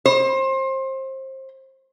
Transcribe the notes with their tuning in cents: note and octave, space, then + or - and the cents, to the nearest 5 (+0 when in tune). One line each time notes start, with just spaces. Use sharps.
C5 +25